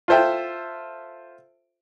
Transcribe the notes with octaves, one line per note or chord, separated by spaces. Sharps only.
F4 A4 C5 E5 G5